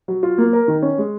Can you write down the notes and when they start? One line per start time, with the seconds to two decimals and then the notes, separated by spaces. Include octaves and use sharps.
0.08 F#3
0.23 F4
0.38 A#3
0.53 A#4
0.68 D#3
0.82 C#4
0.98 G#3